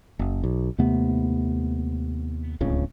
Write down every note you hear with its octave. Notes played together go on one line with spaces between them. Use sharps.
F#1
B1
D#2 C3 A3 B3
D1 C#2 C#3